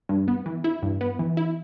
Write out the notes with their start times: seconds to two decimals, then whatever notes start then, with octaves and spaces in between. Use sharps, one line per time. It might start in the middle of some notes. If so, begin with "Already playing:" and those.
0.09 G2
0.28 B3
0.46 E3
0.64 E4
0.83 G2
1.01 B3
1.19 E3
1.37 E4